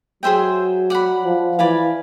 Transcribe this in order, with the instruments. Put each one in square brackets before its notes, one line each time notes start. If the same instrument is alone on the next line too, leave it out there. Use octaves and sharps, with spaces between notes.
[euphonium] F#3 [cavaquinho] G#4 C5 E5 G5
[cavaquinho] D5 F#5 B5
[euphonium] F3
[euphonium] E3 [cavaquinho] D5 F5 G#5 B5